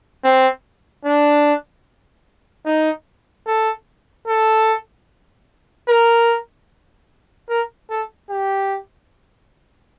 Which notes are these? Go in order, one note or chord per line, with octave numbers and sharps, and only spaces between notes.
C4
D4
D#4
A4
A4
A#4
A#4
A4
G4